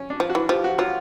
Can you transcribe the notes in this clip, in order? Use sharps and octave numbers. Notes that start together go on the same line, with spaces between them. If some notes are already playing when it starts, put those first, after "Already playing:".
Already playing: C#4
D4
F3
F#4
E3
F3 G4
F#4
F#3 F4